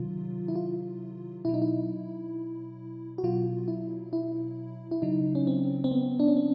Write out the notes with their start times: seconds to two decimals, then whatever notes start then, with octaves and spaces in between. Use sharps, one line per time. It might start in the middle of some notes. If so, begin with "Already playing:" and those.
Already playing: C3 D#3 F#3 F4
0.48 E4
0.55 F4
1.45 B2 F#3 E4
1.54 D#4
1.62 E4
3.18 F#4
3.23 B2 F#3 F4
3.68 E4
4.13 E4
4.91 E4
5.02 C#3 F#3 D#4
5.35 C#4
5.47 C4
5.84 C4
5.91 B3
6.20 D4
6.28 C#4
6.37 C4